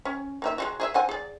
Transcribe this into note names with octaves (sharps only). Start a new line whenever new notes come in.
C#4
A#3 D#4 E5
G#3 F4 F#4
G#4 D#5 E5
C4 F#5 G#5
G#4 D5